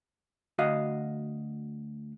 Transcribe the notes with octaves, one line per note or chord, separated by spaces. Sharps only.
D2 F#4 D#5 F5